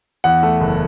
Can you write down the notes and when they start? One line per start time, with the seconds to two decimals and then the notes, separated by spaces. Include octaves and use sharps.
0.24 E2 F#5
0.43 A3
0.61 F#1